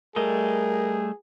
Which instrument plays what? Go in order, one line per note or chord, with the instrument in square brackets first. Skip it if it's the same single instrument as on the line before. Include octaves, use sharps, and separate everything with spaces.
[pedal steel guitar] G3 A3 D#5 [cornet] G#4 [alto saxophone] A#4